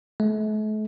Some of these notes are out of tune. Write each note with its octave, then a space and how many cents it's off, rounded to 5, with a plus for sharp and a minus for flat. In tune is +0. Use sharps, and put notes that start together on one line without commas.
A3 -45